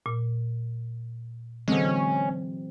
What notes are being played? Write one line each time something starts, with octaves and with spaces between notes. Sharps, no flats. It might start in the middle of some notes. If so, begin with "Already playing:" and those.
A#2
D3 E3 F#3 G#3 C4 C#4